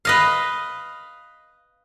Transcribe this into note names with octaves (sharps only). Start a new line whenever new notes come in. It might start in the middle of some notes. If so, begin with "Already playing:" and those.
B4 D#5 F5